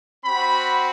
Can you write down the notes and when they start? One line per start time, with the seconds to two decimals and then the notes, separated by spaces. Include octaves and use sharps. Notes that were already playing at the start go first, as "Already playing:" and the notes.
0.25 C4 F#4 B5